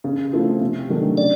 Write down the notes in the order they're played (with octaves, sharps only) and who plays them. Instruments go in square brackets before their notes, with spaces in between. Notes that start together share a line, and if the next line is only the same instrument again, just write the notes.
[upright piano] C#3
F3 A3 C4 E4
C3
D#3 F#3 A3 D4
[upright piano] C#3 [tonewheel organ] D5